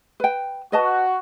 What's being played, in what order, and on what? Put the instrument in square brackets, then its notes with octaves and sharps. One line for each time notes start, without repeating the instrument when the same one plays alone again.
[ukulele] B4 G5
[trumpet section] F#4 [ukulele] B4 D#5 A5